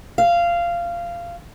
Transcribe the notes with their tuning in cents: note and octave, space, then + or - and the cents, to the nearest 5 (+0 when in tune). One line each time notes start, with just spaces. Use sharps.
F5 -15